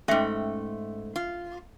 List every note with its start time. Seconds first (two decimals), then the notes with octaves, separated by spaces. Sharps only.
0.08 G#2 A3 C#4 E5 G5
1.16 F4